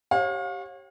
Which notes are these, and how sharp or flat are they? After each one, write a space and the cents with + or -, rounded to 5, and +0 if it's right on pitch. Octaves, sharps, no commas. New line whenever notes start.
G4 -10 C#5 -30 F5 +35